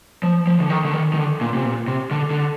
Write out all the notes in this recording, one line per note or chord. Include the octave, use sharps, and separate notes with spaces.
F3
F3
D3
D#3
D3
D#3
D#3
D3
A#2
C3
A#2
C3
D3
D3